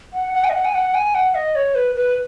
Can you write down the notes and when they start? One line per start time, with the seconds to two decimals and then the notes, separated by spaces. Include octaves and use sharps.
0.14 F#5
0.34 F#5
0.44 G#5
0.49 D#5
0.54 F#5
0.65 G#5
0.74 F#5
0.95 G#5
1.15 F#5
1.35 D#5
1.55 C#5
1.75 B4
1.96 B4